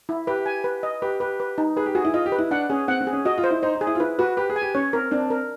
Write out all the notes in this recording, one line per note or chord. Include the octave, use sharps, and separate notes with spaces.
E4
G4 B4
G#5
B4
D#5
G4 B4
G4 B4
B4
D#4
G#4 B4
G4
F#4 G#4
E4
F4 D#5
G4
B4
E4
D4 F#5
C#4 G#4
C4 F#5
C4
G#4
C#4
F#4 D#5
F4
C5
E4
D#4 C5
D#4
G#4
E4
F4
E4 B4
F#4 B4
G4 B4
G#4
G#5
G4
C#4 C#5
C4 A#4
C4 D4
A#4